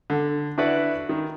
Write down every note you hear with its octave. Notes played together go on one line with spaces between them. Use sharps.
D3
D4 E4 F#4 B4 D5
D#3